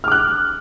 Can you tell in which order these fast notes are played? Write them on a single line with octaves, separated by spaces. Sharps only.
F6 D6 F#6